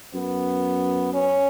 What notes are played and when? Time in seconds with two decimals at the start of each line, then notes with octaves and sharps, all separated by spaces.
0.14 F#2 B3
1.14 C#4